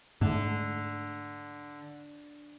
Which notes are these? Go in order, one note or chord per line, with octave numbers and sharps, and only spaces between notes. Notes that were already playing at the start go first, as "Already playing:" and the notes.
G#2 D3 A3